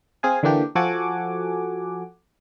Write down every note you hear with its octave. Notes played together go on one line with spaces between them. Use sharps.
C4 G#4 F5 G#5
D3 E3 A#3 D4 G4
F3 F#4 A4 F#5 G#5 D6